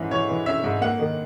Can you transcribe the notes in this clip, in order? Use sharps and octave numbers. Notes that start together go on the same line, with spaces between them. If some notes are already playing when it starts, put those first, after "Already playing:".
Already playing: G#2 E3 C#4
E3 C#5
E3
C#4 E5
G#2
A#3 F#5
D#3